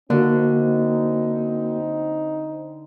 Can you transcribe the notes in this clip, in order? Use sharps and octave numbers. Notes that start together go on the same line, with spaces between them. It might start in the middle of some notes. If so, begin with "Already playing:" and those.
D3 A#3 C4 D#4 F#4